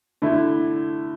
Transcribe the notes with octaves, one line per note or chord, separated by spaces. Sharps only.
D3 A3 E4